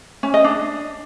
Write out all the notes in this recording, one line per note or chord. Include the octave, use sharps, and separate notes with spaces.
C#4
D#5
D4